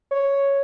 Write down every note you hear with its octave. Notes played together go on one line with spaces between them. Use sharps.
C#5